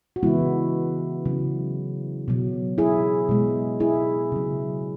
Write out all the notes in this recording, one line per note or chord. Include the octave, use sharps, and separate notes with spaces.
F#4
C#3 E3 G#3 B3 E4
C#3 F#3
B2 F#3
E4 G#4
B2 G#3
E4 G#4
C#3 F#3